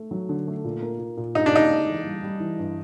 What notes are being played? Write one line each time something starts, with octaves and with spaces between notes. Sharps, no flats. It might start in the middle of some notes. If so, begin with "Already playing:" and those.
Already playing: A3
F#3
D3
A3
A#2
A#3
A#2
A#2
G2 D#4
D4
C#4 D#4
G#3
E3
G3
G3
E3
G2